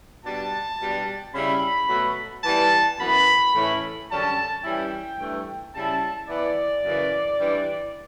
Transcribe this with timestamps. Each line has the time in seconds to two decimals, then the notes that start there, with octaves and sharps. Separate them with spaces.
0.25 B2 G3 D4 A5
0.79 B2 G3 D4
1.34 C#3 G3 C#4 E4 B5
1.89 B2 F#3 A3
2.44 E3 G3 B3 A5
2.99 F#2 E3 B3 B5
3.54 A2 E3 A3 C#4 E4
4.09 F#2 D3 G3 C#4 A5
4.63 E3 G3 C#4 E4 G5
5.19 G2 E3 A3
5.74 C#3 G3 C#4 E4 A5
6.29 E3 B3 E4 D5
6.84 F#2 C#3 E3
7.39 G2 E3 G3